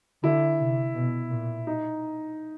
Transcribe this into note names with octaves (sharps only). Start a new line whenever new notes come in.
D3 E4
C3
B2
A#2
D#4